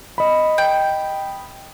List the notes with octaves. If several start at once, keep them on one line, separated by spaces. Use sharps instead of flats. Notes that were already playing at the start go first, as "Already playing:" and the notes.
D#5 B5
G5